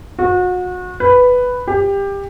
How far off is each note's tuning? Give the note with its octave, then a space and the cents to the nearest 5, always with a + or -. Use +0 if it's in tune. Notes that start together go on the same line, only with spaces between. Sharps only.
F#4 -35
B4 +5
G4 +20